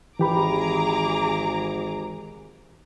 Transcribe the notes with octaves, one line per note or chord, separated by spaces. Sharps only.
G#1 E3 G4 G#4 A#5 B5 D6